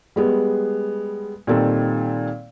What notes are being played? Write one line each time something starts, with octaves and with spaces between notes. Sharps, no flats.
G3 G#3 B3
A#2 D#3 G3 C4 A4